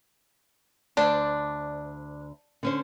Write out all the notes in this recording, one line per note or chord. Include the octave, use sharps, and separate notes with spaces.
D2 D4 C5 D5
D3 C#4 C5